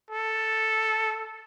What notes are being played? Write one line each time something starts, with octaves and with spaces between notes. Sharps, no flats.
A4